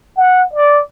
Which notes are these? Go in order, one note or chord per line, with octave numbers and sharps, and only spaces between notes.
F#5
D5